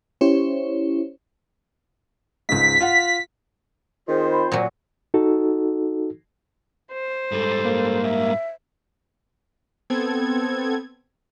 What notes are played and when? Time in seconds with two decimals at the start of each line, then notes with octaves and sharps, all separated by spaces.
0.21 C#4 E4 G4 C5 C#5
2.49 C#2 G#2 B6
2.80 F4 F5 F#5
4.08 D#3 C4 F4 G#4 C5
4.31 B5
4.52 A#2 F#3 F#5
5.14 D#4 F#4 A4
6.93 C5
7.32 G#2 G3 A4
7.65 A#3
8.02 E5
9.90 B3 C4 A4 G#6